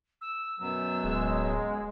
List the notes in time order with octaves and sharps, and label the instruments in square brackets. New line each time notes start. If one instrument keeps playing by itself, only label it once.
[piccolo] E6
[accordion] F#2 B2 F#3 [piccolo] E6
[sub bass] D1 [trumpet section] G#3